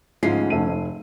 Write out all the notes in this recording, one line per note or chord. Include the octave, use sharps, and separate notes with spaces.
D2 G#2 F3 G#3 C#4 C7
F1 A4 D#7